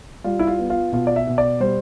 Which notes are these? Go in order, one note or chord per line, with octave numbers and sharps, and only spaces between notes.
G3 F4
E4
F4
B3
F4
B2 F4
D5
E5
B2
D5
G3 C5